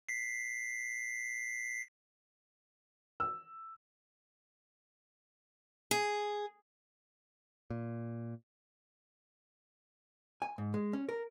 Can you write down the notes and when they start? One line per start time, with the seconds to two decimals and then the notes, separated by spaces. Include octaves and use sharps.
0.09 B6 C7
3.20 E6
5.91 G#4
7.70 A#2
10.42 G#5
10.58 G#2
10.74 G#3
10.93 C#4
11.09 A#4